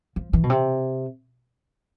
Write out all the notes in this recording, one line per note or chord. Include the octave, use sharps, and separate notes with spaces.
F3
E3
B2
C3